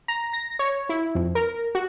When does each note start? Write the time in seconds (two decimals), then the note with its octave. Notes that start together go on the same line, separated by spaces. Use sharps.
0.08 A#5
0.33 A#6
0.59 C#5
0.89 E4
1.15 F2
1.35 A#4
1.75 F#4